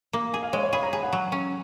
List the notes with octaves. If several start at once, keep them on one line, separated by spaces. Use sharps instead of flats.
A#3
G#4 G#5
F5
G#3 C#5
C#5
G#4 B5
A#5
G#4 G#5
F#5
F#3
C#4